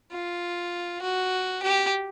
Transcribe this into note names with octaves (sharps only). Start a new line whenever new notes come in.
F4
F#4
G4